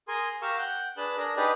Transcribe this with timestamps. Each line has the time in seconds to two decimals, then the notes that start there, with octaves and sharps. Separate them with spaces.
0.08 G#4 A#4 G#5 C6
0.42 G4 A#4 F5 C#6 E6
0.58 F#5 G5
0.97 D4 G#4 B4 A5 F#6
1.17 D4 G#4 A#4
1.36 D4 D#4 G4 G#4 B4 D5